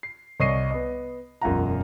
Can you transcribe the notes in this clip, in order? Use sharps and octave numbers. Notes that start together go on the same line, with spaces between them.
C7
C2 C#5 D#5 C#6 C7 D#7
B3 D#5
E1 F#2 F4 F5 F#5 A#5